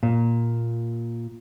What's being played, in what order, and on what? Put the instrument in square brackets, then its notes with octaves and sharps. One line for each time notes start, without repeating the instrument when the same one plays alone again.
[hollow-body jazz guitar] A#2